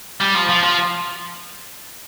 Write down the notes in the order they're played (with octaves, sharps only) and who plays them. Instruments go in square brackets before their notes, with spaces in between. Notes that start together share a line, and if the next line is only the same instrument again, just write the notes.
[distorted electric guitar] G3
F3
F3
F3